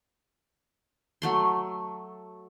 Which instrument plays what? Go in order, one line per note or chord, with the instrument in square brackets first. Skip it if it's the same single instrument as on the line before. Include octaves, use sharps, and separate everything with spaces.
[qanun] F#3 A3 C6